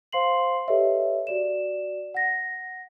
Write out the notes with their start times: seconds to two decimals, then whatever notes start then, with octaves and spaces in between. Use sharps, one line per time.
0.13 C5 F5 C6 C7 F#7
0.68 G4 A4 B4 C#5 D#5 E5
1.27 F#4 D5 E7
2.14 F#5 A#6